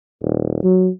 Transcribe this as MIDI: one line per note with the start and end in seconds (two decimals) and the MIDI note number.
0.23 0.63 27
0.64 0.89 54